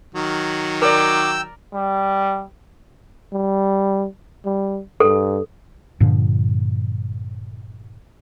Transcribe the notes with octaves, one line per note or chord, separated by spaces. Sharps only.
D#3 F#3
A#4 D5 G5 D6 E6
G3
G3
G3
G2 A4
G2 A#2 D3 F3